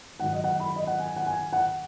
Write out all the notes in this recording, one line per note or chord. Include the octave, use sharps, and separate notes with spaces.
G#2 D#3 F#3 F#5
D#5
F#5
B5
D#5
F#5
G#5
F#5
G#5
F#5